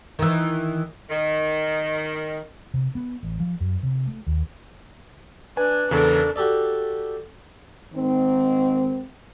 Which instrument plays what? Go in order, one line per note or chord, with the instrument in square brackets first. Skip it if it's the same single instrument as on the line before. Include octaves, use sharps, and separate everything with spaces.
[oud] D#3 E3
[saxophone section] D#3
[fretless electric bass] C3
B3
A1
F3
F#2
C3
A3
D#2
[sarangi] D4 [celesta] B4 [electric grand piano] G#5
[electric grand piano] E2 C#3 [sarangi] D4 [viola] A4 A#4
[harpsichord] F#4 G4 A4 D5
[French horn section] G#2 D#3 C4